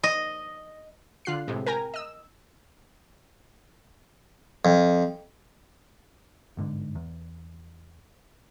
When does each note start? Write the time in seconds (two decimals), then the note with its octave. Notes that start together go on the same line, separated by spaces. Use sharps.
0.03 D#5
1.25 D3 F4 F#6 C7
1.48 A2 C3 G#3
1.66 A#4 G5 G#5 A#5
1.94 D#5 E6
4.65 F2
6.57 G1 G#2 D3
6.95 E2